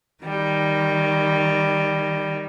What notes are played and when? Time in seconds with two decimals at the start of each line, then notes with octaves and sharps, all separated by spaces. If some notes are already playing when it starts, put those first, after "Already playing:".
0.23 D#3 G3